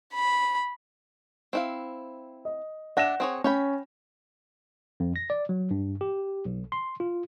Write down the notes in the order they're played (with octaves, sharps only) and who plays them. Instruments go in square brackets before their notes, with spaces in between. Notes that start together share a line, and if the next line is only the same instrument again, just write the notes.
[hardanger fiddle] B5
[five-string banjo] C4 E4 F5
[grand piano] D#5
[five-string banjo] D4 E5 [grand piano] F#5 A#6 E7
[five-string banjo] C4 G#4 C#5
[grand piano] C#4 [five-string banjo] C#5 G5 B5
[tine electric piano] F2
A#6
D5
F#3
G2
G4
B1
C6
F4